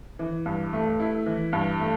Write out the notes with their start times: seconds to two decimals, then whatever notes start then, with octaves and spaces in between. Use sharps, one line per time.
0.19 E3
0.46 G2
0.73 A3
1.00 E4
1.26 E3
1.53 G2
1.79 A3